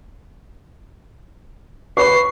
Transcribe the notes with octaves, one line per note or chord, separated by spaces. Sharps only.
B4 C#6 C7